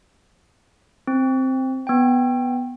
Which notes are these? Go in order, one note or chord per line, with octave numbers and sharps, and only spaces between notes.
C4
B3 G5